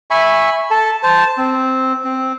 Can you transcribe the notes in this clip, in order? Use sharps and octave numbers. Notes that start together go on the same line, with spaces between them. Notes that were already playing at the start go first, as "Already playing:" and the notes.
E5 G#5 B5 C#6
A4 A5
C5 A5
C4
C4